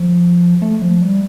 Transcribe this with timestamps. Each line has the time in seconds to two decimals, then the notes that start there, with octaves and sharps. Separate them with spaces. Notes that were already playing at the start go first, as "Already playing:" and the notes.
Already playing: F3
0.62 A3
0.82 F3
1.02 G3